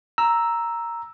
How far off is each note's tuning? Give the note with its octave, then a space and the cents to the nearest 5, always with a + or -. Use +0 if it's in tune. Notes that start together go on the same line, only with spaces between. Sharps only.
A#5 +0 E6 +0